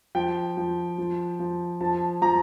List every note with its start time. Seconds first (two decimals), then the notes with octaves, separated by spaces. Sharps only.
0.15 F3 G5
0.57 F3
0.98 F3
1.39 F3
1.81 F3 A5
2.22 F3 A#5